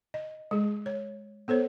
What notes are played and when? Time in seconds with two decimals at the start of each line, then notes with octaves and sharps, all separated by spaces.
0.14 D#5
0.51 G#3 G#4
0.86 C#5
1.48 B3 A4 C5 C#5